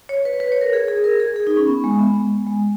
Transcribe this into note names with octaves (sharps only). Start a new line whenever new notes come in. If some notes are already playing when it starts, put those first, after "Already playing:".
C#5
B4
B4
C#5
A#4
G#4
G#4
A#4
G#4
G#4
D#4
C#4
B3
G#3
B3
G#3
G#3